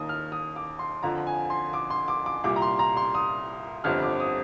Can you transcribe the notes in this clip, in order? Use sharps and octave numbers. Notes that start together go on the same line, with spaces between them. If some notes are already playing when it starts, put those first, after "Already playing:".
Already playing: D#2 D#3 A#3 D#6
F6
D#6
D6
C6
F2 D3 F3 A#5
G#5
C6
D6
C6
D6
D6
C2 A#2 G3 D6
A#5
C6
A#5
C6
D#6
G1 F2 D3 G3 C4 F6
D6
D#6